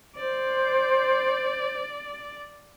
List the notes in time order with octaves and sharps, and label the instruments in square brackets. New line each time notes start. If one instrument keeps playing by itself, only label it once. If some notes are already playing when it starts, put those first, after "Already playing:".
[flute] C5 [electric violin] D5